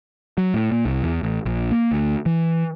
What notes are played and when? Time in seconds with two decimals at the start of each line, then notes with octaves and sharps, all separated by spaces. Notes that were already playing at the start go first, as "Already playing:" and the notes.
0.38 F#3
0.54 A2
0.72 A#2
0.85 C2
1.03 E2
1.23 A1
1.46 A#1
1.71 A#3
1.92 D2
2.26 E3